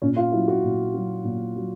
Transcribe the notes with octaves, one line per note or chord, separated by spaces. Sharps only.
A#2 C#4
F4
F#3 E4
F#4
A#2
F#3
A#2
F#3